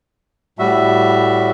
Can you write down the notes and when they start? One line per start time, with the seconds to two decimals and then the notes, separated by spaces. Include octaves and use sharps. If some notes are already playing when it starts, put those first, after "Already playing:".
0.59 A2 G3 F#4 E5